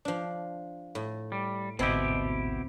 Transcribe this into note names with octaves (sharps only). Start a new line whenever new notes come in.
F3 D4
A2
G3
G#1 D2 B2 C4 E4 G4 D#5